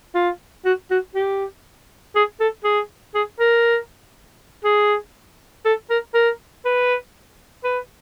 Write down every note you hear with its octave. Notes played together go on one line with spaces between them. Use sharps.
F4
F#4
F#4
G4
G#4
A4
G#4
G#4
A#4
G#4
A4
A#4
A#4
B4
B4